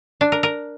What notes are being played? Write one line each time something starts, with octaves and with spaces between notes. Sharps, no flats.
D4
A#4
A#4